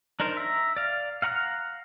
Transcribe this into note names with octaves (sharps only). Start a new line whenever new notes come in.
D4 D#4 A#4 C5
E5 A#5
D5 F5
F5 F#5 A#5 C#6 F6